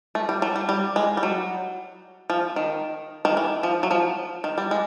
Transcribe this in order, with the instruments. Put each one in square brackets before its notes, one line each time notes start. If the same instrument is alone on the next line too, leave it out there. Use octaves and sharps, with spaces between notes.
[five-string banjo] A3
G3
F#3
G3
G3
G#3
G3
F#3
F3
D#3
D#3
E3
F3
F#3
F3
D#3
G3
G#3